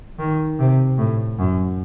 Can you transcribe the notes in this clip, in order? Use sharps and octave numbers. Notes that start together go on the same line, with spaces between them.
D#3
C3
A2
F#2